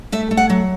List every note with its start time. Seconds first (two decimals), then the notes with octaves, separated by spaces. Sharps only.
0.12 A3 E5
0.31 A3
0.37 F#5
0.50 F#3